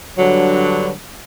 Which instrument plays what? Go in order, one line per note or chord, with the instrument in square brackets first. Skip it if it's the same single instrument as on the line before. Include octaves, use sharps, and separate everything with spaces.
[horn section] G2 D3 F#3